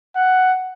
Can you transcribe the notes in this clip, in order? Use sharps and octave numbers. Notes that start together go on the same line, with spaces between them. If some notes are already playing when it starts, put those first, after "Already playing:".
F#5